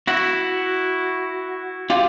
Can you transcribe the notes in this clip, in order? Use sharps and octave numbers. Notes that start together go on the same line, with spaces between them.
E4 F#4
F4 G4